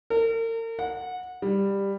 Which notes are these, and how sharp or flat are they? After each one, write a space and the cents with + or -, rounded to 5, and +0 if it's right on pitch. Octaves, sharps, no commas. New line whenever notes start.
A#4 -40
F#5 -20
G3 +10